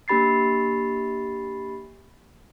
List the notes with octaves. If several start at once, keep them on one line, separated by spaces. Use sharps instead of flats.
A#3 D4 G4 B5 A6 C7